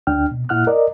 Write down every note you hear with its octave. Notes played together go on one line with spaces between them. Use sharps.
D2 D4 G5 F6
B2
A#2 E4 F#5 F6 F#6
A#4 D5 D#5